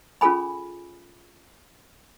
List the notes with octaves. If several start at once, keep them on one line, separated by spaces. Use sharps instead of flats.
C#4 F4 G#4 A4 G#5 B5